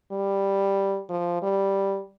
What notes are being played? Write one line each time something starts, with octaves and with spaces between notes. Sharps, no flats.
G3
F3
G3